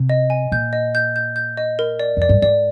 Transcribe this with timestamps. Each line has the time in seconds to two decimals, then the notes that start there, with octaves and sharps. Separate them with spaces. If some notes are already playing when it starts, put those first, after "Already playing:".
Already playing: C3
0.09 D#5
0.30 G#5
0.52 A#2 G6
0.73 D#5
0.95 G6
1.16 G6
1.36 G6
1.57 D#5
1.79 A#4
2.00 D5
2.17 F2 D5
2.29 G2
2.42 G#2 D5